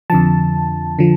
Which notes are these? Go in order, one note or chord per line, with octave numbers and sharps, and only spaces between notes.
F2 D3 F3 A5
D3 F3